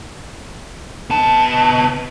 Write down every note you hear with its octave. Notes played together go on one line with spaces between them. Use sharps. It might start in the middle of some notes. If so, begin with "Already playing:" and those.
B3 A5